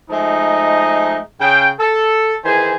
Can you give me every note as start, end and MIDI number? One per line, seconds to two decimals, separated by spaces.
0.10 1.18 53
0.10 1.18 56
0.10 1.18 57
0.10 1.18 63
1.41 1.70 49
1.41 1.70 79
1.80 2.35 69
2.44 2.76 51
2.44 2.76 52
2.44 2.76 68
2.44 2.76 72
2.44 2.76 80